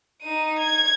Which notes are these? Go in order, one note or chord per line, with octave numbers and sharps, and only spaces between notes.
D#4 D#7
G#6